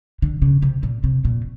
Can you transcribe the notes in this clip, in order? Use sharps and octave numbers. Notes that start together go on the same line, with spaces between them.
D3
C#3
C3
A#2
C3
A#2